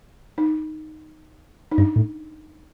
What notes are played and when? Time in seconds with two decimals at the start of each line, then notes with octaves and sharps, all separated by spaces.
0.38 D#4
1.71 D#4
1.78 G2 D4
1.96 A2